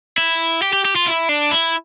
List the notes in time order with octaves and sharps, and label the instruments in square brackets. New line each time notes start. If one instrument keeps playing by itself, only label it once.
[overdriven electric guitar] E4
G4
G4
G4
F4
E4
D4
E4